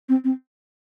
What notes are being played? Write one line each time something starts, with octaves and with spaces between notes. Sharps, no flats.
C4
C4